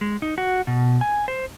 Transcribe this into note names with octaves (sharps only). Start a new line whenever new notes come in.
G#3
D#4
F#4
B2
G#5
C5